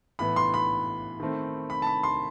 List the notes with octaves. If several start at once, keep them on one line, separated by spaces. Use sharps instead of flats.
A2 E3 B3 B5
C6
B5
D#3 A3 C4
B5
A5
B5
C6